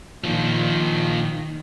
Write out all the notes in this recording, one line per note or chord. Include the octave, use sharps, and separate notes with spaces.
A#2 D#3 F3